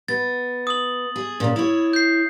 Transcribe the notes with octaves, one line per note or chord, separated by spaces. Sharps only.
B3 A6
D#6 F#7
G#4
A#2 C#3
E4 C#5
G6 C7